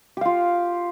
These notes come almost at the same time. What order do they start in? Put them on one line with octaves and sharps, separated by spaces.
G4 F5 F4